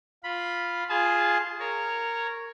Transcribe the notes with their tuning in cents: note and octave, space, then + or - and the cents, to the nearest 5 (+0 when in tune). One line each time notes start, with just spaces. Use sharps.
F4 +0 B5 -5
F4 +0 G#4 +0 A5 -35
A#4 -10 C#5 +0